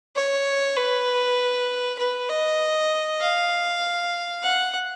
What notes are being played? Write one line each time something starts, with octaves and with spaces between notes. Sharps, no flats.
C#5
B4
B4
D#5
F5
F#5